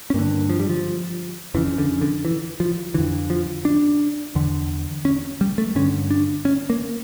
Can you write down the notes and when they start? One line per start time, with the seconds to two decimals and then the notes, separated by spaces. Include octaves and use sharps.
0.10 C#4
0.14 G2 D3 A#3
0.50 F3
0.60 G3
0.69 F3
1.54 F2 C#3 E3
1.78 D3
2.01 D3
2.25 E3
2.60 F3
2.94 F2 D3 E3
3.30 F3
3.65 D4
4.35 E2 D3
5.05 C#4
5.41 G3
5.58 A3
5.75 G2 D3 C#4
6.10 D4
6.45 C#4
6.70 A#3